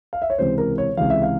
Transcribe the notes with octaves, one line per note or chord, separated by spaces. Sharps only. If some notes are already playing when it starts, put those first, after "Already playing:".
F5
E5
C#5
C#2 C3 E3 C5
A#4
C#5
C#2 C3 E3 F5
E5
F5